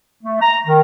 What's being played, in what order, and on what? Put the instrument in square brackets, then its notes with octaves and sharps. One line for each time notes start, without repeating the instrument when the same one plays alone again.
[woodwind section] A3
A#5
D#3